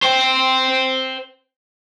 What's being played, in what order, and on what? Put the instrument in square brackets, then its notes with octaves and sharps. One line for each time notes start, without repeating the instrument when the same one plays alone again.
[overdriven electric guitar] C5 G5